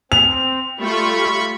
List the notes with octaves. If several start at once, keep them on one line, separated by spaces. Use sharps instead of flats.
C4 F7
G3 A3 F4 B5 C#6